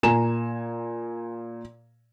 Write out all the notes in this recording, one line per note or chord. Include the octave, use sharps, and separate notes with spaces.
A#2 G#5 A#5 E7